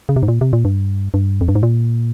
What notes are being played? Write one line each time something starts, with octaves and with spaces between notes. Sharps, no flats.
C#3
C3
G#2
A#2
C3
A#2
G2
G2
F2
G2
G#2
A#2